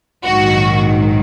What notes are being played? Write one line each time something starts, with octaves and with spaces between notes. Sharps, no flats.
A#1 G#2 D#3 F#3 F#4